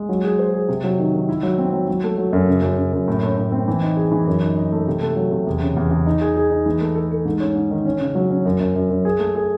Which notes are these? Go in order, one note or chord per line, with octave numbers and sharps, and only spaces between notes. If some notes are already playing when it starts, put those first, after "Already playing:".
Already playing: G#3
F#3
G#4
C5
G#4
C3
F#3
D#3
D#3
E4
F#3
C4
F#3
F#3
A3
F#3
F#2
C#3
F#2
C#3
F#2
A2
A2
A2
C4
E3
D#4
G#4
E3
F#2
D#4
D#4
A3
C3
A3
F#3
C3
E2
C#3
E2
E2
D#4
G#4
G#4
D#4
E3
A3
A4
A4
G#2
C#4
G#2
D#3
C#4
C#3
F#3
C#4
F#2
F#2
F#2
F#2
G#4
A3
G#4